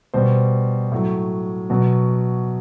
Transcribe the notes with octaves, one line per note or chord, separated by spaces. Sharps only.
B2 G3 C5
A2 F#3
B2 F#3